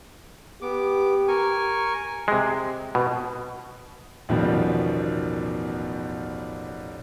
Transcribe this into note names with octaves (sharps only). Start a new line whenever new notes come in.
B3 G4 D6
A#4 G#5 C#6
C3 G#3
B2
A1 E2 B2 D#3 F3 G3